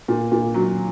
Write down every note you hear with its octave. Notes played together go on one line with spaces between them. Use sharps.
A#2
A#2
F#3